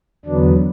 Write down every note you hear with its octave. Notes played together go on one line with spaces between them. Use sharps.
E2 D3 F#3 B3 D4